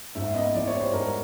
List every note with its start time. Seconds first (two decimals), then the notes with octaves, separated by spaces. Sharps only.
0.15 G#2 E5
0.34 B3 D#5
0.54 E3 D5
0.67 C#5
0.74 G3
0.80 C5
0.93 G#2 A#4